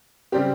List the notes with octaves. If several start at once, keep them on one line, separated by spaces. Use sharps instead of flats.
C#3 G3 C4 G4